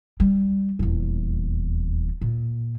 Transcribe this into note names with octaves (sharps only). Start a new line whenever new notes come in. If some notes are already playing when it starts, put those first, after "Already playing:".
G3
D#1 E2
A#2